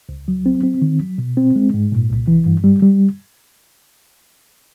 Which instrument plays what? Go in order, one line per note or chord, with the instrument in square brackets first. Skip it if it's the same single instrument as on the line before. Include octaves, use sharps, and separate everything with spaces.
[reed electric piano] C#2
F#3
C4
C4
D#3
F#3
B2
C4
G#3
G#2
A#2
C2
E3
G2
G3
G3